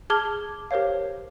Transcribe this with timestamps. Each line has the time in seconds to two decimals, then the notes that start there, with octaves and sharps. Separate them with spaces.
0.10 G#4 A5 D6 F6 G#6 G7
0.71 G4 A#4 C5 C#5 F5